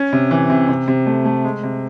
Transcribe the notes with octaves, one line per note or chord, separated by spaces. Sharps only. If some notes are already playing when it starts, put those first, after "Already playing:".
Already playing: C#4
C3
E3
C3
C3
C3
A3
A3
G#3
C3